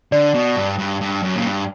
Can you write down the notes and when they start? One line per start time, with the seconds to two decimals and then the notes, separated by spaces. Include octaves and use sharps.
0.12 D3 D5
0.34 B2
0.56 G2
0.78 G2
1.01 G2
1.22 F#2
1.36 A#2
1.45 G2